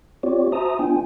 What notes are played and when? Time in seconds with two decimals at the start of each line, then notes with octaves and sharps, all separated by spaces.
0.23 C4 F4 G4 C#5 D5
0.52 F#4 C5 E5 A5 A#5 D#6
0.79 B3 D4 F4 G5 G#5